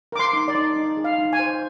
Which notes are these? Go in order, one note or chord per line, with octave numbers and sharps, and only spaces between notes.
A#4 D6
C6
D#4
D5
D#4
D#4
G#4
F5
D#4
G#5
C5